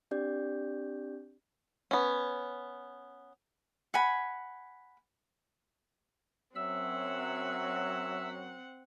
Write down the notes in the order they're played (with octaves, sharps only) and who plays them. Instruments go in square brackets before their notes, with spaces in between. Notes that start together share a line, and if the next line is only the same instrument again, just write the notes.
[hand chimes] C4 D4 G4 D5 G6
[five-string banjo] B3 C#4
[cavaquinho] F#5 G#5 B5
[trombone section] F#2 F#3 [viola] C4 F#5 [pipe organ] E5 E6